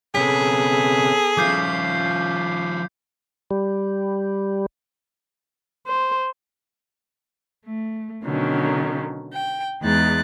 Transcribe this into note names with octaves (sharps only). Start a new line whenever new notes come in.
C3 B3 C#4 G#4 A4 B6
F3 C#4 E4 F4 D6 G6 C7
G3
C5
A3
B2 D3 D#3 F#3 C#4
G5
E2 G#3 D#4 F#6 A6